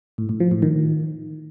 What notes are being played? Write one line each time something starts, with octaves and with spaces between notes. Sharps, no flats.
A2
A2
F3
A2
D#3